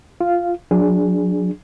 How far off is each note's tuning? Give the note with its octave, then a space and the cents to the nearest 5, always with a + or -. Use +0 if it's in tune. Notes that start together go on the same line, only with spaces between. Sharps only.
F4 +0 F5 -5
F#3 -30 D4 +0 G#4 +0